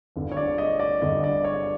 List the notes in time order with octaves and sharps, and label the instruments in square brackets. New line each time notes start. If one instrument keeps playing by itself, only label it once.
[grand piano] G1 G2 D3
C#5
D5
D#5
D5
G1 G2 D3 D#5
D5
C#5